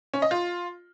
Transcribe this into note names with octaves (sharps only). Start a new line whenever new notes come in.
C#4
D#5
F4